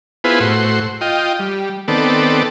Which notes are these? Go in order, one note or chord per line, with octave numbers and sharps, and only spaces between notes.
B3 E4 F4 G#4 B4 C5
A2 F#4 C5
F4 D#5 G5
G3
D#3 B3 C4 A4 D5